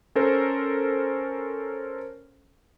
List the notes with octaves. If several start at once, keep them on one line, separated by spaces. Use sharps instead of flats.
C#4 A4 A#4 C5